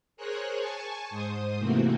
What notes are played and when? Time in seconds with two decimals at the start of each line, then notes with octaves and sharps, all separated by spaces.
0.17 G#4 A#4 C5 C#5 F#6
0.58 G#5 A5 C#6
1.10 G#2 C5 D#6
1.59 C3 E3 A3 A#3 C4 F#4